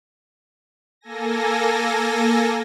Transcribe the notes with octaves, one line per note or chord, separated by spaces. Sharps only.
A#3 A4 G#5 A#6